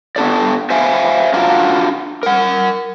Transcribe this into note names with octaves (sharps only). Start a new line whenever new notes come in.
B3 D4 A4 D5
C5 E5 F5 G#5
D4 F4 F#4 F5 A#5
A#4 F#5